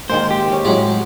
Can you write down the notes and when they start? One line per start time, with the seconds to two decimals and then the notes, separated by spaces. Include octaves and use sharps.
0.10 D#3 G#3 A#3 C5
0.30 G4
0.50 G#3 C#4
0.65 A2 F#3 G#3 C4